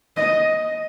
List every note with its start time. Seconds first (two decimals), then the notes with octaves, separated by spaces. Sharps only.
0.17 D#5